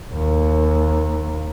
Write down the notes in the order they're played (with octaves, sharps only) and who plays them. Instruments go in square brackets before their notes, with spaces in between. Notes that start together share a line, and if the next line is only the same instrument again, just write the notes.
[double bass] D#2